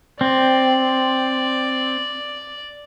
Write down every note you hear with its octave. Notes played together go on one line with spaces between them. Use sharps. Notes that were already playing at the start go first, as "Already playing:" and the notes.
C4 D5